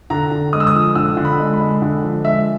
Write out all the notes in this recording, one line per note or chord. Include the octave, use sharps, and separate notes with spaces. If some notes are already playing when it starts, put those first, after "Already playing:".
D3 A#5
D3
G#3 D#6
E6
D#6
F3
D3 E6
D3
B5
G#3
B5
G#3
D3
F3
G#3 E5